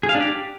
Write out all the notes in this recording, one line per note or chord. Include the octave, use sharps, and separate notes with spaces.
G#4
F5
D4
G4